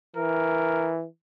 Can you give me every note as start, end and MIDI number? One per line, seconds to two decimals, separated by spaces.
0.16 1.05 52
0.16 0.94 70